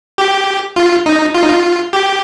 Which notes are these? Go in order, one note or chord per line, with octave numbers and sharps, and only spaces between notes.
G4
F4
D#4
F4
D#4
F4
G4